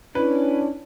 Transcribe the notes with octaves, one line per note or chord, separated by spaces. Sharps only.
C#4 D4 E4 B4